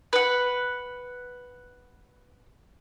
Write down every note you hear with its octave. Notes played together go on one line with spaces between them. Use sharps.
B4 F#5